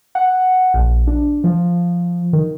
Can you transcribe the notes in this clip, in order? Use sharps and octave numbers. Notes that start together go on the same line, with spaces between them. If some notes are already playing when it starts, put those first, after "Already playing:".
F#5
A#1
D4
F3
D#3